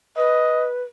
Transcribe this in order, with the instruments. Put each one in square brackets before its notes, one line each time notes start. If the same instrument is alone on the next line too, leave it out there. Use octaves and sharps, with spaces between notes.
[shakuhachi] B4 [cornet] D#5